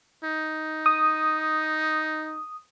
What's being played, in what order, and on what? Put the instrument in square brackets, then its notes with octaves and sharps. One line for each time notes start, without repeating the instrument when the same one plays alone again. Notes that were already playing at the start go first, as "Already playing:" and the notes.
[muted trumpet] D#4
[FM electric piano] D#6